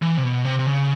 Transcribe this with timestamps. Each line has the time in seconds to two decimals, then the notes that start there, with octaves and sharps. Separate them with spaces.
0.02 E3
0.17 C3
0.24 B2
0.45 C3
0.59 C3
0.66 C#3